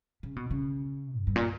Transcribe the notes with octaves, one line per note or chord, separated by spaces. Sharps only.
C#3
B2
C#3
F#2
G2
A#2